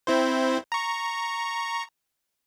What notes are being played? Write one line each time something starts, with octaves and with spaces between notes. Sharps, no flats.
C4 E4 C5
A#5 C#6